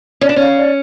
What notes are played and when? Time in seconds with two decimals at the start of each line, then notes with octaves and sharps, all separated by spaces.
0.21 C#4 D5
0.29 D4
0.36 C#4 F5
0.57 D5